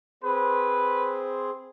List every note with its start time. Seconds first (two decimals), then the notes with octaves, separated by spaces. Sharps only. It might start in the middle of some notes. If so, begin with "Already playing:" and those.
0.23 C4 G#4 B4 C5